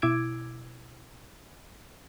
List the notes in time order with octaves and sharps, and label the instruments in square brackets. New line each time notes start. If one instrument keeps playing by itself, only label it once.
[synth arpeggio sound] B2 E4 D6 E6 G#6 D7